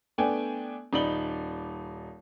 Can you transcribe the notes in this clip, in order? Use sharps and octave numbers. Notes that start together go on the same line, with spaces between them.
A3 B3 D4 G5 G#5
D#1 D#4 D5 B5 F#7 G7